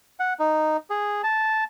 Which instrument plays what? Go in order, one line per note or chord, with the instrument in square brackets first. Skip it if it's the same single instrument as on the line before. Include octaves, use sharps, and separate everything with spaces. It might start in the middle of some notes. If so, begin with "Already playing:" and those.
[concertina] F#5
D#4
G#4
A5